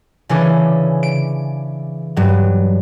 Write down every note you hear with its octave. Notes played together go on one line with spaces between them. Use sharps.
C#3 E3 C#4 D4
D7
G2 F#3